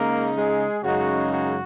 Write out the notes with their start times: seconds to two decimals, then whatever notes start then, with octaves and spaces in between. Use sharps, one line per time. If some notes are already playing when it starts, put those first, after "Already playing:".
Already playing: C#3 G#3 A#3 D#4 A#4
0.38 G#3 G#4
0.84 F#2 C#3 G#3 D#4 F#4
1.31 F#4